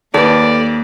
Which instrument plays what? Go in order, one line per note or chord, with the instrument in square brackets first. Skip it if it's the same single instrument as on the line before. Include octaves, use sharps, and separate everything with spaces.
[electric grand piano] D#2 [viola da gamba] A#3 [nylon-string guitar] A4 B4 [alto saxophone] D5